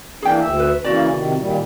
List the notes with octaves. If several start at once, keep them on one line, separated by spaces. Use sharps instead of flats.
E3 A#3 D4 G#4 G5
D2 E5
B4
C#3 E3 A#3 E4 F#4 D5
C3 D#3
A#2 D#3 G3